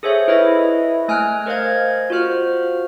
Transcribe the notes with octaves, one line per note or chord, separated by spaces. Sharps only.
G#4 A4 C5 C#5 E5
E4 B4 C#5 D#5 E5
A3 G#5 F6 F#6 D7
A#4 C5 D#5 F5 G#6
F4 F#4 C5 F6